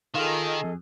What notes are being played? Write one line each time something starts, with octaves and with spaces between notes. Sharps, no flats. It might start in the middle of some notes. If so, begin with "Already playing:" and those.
D#3 F4 G#4 A4 D#5 F5
F2